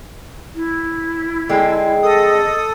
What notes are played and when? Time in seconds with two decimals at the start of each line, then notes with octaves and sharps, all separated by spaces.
0.55 E4
1.49 D3 G#3 C4
2.03 A4 D#5 D#6